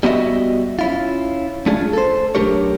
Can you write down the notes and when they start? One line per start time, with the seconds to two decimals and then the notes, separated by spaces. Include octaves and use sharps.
0.03 G3 B3 E4 F#4 D#5 E5
0.79 C#4 E4 F4
1.66 A3 C#4 D4 F4 G#4
1.93 A4 C5
2.35 B1 A3 D4 G4 A#4 C#5